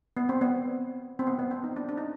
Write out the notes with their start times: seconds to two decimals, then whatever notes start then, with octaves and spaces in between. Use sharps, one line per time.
0.17 B3
0.29 C4
0.41 B3
1.19 C4
1.27 B3
1.39 B3
1.51 C4
1.64 D#4
1.76 D4
1.89 D4
1.98 D#4